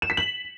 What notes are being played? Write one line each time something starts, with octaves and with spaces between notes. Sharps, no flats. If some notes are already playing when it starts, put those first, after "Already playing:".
E7
B6
F#7